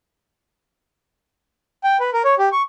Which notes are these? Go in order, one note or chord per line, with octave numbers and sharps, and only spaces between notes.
G5
B4
A#4
C#5
G4
C#6